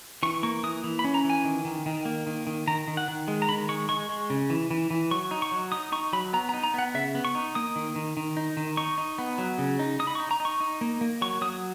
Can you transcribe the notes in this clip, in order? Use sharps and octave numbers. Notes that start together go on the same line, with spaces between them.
E3 C#6
A#3 C#6
E3 D#6
E3
B5
C#4
A#5
E3
G#5
D#3
D#3
D#3
A#3
D#3
D#3
D#3 A#5
D#3
F#5
D#3
G#3
A#5
D#3 B5
G#3 C#6
G#3 C#6
G#3
C#3
E3
E3
E3
F#3 C#6
D#4
C#6
F#3
D#4 D#6
D#4 C#6
F#3 B5
B3 A#5
A#5
D#4
A#5
B3 F#5
C#3 E5
B3
C#6
D#4
A#3 D#6
D#3
D#3
D#3
D#4
D#3
D#4 C#6
D#4
B3
F#3
C#3
D#4
D#4 D#6
B5
C#6
D#4
A#5
D#4
C#6
D#4
A#3
A#3
F#3 C#6
F#3 D#6